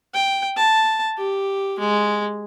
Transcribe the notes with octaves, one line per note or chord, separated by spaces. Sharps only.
G5
A5
G4
G#3